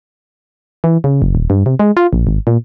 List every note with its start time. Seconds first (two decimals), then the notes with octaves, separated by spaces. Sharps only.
0.84 E3
1.04 C#3
1.22 F#1
1.35 D#1
1.50 G2
1.66 C3
1.79 G#3
1.97 F4
2.13 A#1
2.27 G#1
2.47 A#2